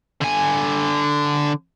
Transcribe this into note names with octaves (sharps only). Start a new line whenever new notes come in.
D3 G#5